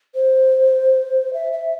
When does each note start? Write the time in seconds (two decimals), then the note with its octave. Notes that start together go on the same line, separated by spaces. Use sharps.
0.15 C5
1.33 E5
1.53 E5